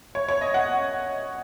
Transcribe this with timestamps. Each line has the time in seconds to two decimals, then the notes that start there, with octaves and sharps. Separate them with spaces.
0.15 C#5
0.28 C#5
0.41 D#5
0.54 F#5